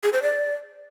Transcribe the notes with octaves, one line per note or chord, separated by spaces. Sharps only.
G#4
C5
D5